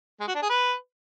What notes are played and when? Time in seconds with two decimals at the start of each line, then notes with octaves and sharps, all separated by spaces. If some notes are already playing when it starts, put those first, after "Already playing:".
0.20 G#3
0.27 F#4
0.35 D4
0.42 G#4
0.49 B4